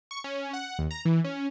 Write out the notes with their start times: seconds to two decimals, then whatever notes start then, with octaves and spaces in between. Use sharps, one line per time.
0.11 C#6
0.24 C#4
0.53 F#5
0.79 D#2
0.91 A#5
1.05 E3
1.24 C#4